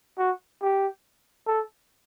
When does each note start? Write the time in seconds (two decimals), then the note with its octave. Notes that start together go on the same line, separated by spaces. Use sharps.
0.19 F#4
0.62 G4
1.48 A4